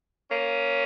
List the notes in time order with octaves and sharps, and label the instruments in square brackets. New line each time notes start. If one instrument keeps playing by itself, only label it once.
[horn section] A#3 C#4